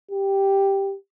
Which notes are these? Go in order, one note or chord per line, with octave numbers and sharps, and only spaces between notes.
G4